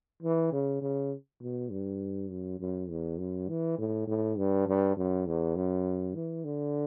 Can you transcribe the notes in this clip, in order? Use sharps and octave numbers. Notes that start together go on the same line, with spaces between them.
E3
C#3
C#3
B2
G2
F#2
F#2
E2
F#2
E3
A2
A2
G2
G2
F#2
E2
F#2
E3
D3